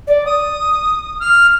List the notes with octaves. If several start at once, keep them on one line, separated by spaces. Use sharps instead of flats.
D5
D#6
F6